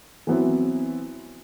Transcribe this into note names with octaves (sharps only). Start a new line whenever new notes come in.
E3 F#3 B3 C4 E4